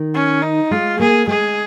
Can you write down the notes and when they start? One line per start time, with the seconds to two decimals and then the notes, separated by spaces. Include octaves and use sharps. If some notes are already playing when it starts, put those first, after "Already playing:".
Already playing: D#3
0.14 C#4
0.42 D#4
0.71 G#3 F4
0.99 A#3 G#4
1.27 G#3 G#4